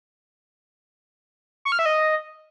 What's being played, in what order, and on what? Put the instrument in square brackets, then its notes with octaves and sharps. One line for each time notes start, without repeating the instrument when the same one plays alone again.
[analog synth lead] C#6
F6
E5
D#5